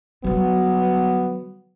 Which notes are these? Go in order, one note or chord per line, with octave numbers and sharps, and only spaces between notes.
D3 F#3 G3 B3